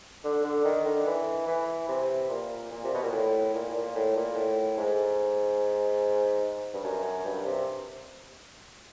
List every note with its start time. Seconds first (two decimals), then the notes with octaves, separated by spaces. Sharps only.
0.24 D3
0.44 D3
0.65 D#3
0.86 D3
1.06 E3
1.48 E3
1.89 C3
2.30 A#2
2.71 A#2
2.84 C3
2.94 B2
3.03 A#2
3.12 A2
3.54 A#2
3.70 A2
3.75 A#2
3.95 A2
4.16 A#2
4.36 A2
4.77 G#2
6.73 G2
6.84 F#2
7.04 F#2
7.25 G2
7.45 C3